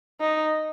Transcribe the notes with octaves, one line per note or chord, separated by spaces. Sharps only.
D#4